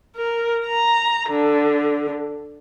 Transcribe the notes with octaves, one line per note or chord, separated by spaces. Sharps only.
A#4
A#5
D3